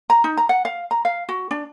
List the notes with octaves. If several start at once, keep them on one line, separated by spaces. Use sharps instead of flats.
A#5
D#4
A#5
F#5
F5
A#5
F5
F#4
D4